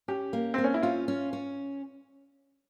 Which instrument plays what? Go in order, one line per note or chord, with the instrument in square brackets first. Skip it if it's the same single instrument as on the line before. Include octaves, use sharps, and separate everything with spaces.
[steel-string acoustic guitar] C#4 [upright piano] G4
[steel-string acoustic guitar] A#3
[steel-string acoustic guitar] A#3 [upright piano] C4
[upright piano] C#4
E4
[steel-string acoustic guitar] C#4 [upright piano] F4
[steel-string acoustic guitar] C#4
C#4